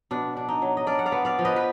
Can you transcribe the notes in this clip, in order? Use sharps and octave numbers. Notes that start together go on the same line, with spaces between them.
B2 D4
D4
D#4
F#3
D#5
D4 A#4 D5
F#5
D5 F5
B3
D5 F5
F3
B4 D#5
B4